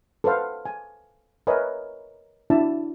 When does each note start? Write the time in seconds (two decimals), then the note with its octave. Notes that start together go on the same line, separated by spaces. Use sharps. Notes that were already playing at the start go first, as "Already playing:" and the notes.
0.24 A4 B4 C5 F5 F#5
0.65 G#5
1.47 A#4 B4 C#5 D#5 E5 G#5
2.50 D4 E4 F#4 D5 E5 A5